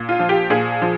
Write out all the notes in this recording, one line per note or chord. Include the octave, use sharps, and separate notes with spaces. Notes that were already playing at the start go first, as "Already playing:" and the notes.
Already playing: A#2
F4
F3
G4
A#2 G#4
F3